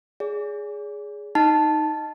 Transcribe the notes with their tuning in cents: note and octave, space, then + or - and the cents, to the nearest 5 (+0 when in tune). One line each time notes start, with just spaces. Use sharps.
G#4 +0 D5 -45
D#4 +0 A5 +0